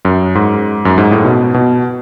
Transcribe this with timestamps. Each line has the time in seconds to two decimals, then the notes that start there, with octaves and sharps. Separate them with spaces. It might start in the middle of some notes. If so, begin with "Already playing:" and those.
0.05 F#2
0.35 G#2
0.85 F#2
0.98 G#2
1.11 A2
1.25 B2
1.54 B2